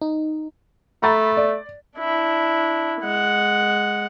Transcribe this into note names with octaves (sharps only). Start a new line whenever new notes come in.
D#4
A3 A#5 B5 A6
D5
D4 E4
G#3 F#5